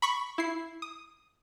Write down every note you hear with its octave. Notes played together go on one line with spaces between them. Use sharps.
B5 C#6 B6
E4 C7
D#6